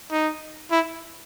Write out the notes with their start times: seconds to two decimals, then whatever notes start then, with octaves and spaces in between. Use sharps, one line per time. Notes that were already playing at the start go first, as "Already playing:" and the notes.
0.11 D#4
0.71 E4